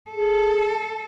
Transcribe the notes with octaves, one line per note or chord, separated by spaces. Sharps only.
G#4 A4